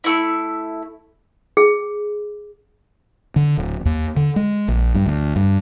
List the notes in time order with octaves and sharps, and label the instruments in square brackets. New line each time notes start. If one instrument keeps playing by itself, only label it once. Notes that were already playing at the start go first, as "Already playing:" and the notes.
[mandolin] A3 E4
[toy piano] G#4
[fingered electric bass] D3
D1
D#2
D3
G#3
A#1
G2
D2
G2